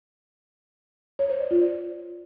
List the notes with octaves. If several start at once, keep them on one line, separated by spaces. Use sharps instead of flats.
C#5
C5
D5
F4
D5